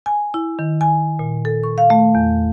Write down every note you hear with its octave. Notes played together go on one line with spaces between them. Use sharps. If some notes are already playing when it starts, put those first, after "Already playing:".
G#5
E4
D#3
G#5
A#2
A4
C#6
F5
A3
E2